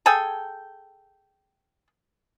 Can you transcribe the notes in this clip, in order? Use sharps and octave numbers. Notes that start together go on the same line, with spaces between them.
G#4 A4 G5 G#5